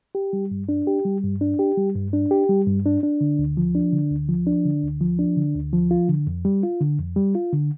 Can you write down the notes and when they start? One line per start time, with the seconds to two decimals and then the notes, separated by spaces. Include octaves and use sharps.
0.15 G4
0.33 G3
0.51 G2
0.69 D4
0.87 G4
1.05 G3
1.23 G2
1.41 D4
1.59 G4
1.77 G3
1.95 G2
2.13 D4
2.31 G4
2.49 G3
2.67 G2
2.86 D4
3.03 D4
3.21 D3
3.39 D2
3.57 F3
3.75 D4
3.93 D3
4.11 D2
4.29 F3
4.47 D4
4.65 D3
4.83 D2
5.01 F3
5.19 D4
5.37 D3
5.55 D2
5.73 F3
5.91 F4
6.09 D3
6.27 F2
6.45 G3
6.63 F4
6.80 D3
6.99 F2
7.16 G3
7.35 F4
7.53 D3